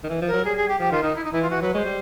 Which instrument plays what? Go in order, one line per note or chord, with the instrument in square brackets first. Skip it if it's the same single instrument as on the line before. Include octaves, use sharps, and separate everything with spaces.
[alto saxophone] D#3
E3
F3
[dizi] A#4
[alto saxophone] F#3
[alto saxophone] G3 [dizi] G#4
[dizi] G#4
G4
[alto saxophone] F3 [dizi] G4
[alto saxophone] D#3 [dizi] F4
[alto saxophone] D#3 [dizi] D#4
[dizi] E4
D#4
[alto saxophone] E3 [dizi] E4
[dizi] F4
[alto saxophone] E3 [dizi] F#4
[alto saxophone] F#3 [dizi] B4
[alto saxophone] G#3 [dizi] C#5
[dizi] C5
[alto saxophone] G3